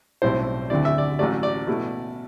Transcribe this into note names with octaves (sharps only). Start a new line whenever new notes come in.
B1 A2 G3 C4 E4 C5
D2 D3 A3 C4 E4 D5
E5
D5
A1 A2 F#3 A3 D5
D5
B2 A3 E4